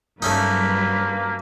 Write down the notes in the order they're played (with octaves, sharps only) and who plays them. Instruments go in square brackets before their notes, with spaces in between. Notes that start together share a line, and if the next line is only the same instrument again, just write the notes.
[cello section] G2 F#3 B4 [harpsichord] A3 C#4 D#4 [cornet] A#3